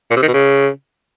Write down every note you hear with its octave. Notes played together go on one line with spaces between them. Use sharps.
A#2
C3
D#3
B2
C#3